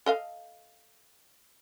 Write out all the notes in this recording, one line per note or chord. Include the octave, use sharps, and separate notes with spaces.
A4 D#5 F5